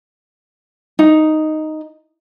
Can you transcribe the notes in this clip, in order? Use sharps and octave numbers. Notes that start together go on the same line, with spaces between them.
D#4